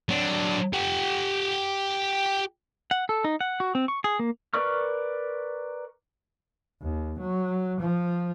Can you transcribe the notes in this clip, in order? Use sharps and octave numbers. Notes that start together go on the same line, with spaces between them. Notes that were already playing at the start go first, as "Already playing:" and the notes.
F#3 D4
G4 F#5
F#5
A4
D#4
F#5
F#4
C4
C#6
G#4
A#3
A#4 B4 D5 C#6 F6
D#2
F#3
F3